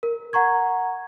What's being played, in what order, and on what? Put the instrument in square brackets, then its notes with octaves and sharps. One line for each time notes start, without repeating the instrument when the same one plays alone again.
[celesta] A#4
F#5 A#5 C#6 G#6